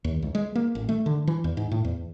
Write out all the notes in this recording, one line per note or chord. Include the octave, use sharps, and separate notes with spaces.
D#2
C#2
G#3
A#3
A1
A3
D3
E3
E2
G#2
A2
E2